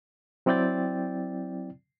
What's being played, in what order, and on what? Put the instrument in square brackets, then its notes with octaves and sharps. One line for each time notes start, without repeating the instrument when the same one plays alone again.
[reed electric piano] F#3 C4 E4 D5 G5 A6